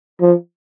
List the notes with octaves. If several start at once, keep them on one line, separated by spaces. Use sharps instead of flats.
F3